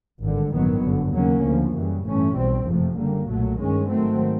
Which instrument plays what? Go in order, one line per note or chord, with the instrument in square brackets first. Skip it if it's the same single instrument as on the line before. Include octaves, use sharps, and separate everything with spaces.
[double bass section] G#1 G2 D3
A1 G2 D#3 F#3 B3
G1 F#2 D3
D#2 C#3 F#3 A#3 C#4
D2 C#3 F3
F#2 C#3 E3 G3
A1 G2 E3 A3 C#4
B1 B2 G3 C4
F#1 F2 C3 F3 A3
F#2 D3 G3 A#3
B1 A#2 F#3 A3
G2 D#3 G#3 C#4
G#2 D#3 F#3 A3 C4